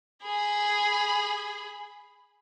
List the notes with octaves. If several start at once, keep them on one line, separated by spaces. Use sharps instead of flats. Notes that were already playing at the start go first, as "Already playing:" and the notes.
G#4 B5